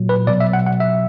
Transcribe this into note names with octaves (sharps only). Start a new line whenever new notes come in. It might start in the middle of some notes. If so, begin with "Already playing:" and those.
Already playing: A#2 F#3
B4
B2 F#3 D5
E5
F#5
F#5
E5